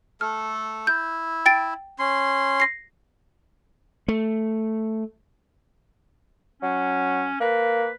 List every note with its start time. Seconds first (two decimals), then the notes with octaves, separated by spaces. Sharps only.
0.21 A3 A4 F6
0.87 E4 G6
1.46 G5 A6 D7
1.99 C#4 C6
2.60 A#6 C7
4.08 A3
6.62 F#3 C#4
7.40 A#3 B4